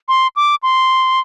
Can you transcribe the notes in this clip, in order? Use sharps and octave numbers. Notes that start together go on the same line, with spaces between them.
C6
D6
C6